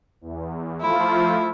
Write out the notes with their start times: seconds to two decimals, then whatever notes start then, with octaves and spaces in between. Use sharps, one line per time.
0.21 E2
0.81 F3 A3 E4 F4